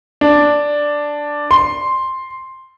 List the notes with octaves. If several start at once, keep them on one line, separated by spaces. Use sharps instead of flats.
D4
C6